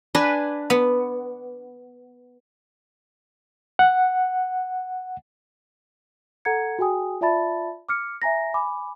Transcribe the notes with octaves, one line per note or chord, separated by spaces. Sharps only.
D4 B4 G#5
B3
F#5
A4 F#5 A#5 G#6 C#7
F#4 G#4 G5 G#5 D#6
F4 D5 E5 A5 B5 A6
D6 F6 C#7
E5 G#5 A#5 A#6
G#5 B5 D6